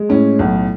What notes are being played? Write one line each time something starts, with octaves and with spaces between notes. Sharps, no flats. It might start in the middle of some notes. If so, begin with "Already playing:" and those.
Already playing: G#3
A2 C#4
B1